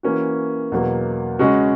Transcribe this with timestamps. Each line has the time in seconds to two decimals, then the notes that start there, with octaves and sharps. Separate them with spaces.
0.03 E3 A#3 C#4 F#4
0.72 E2 B2 F#3 A#3
1.39 C#3 G#3 C#4 F#4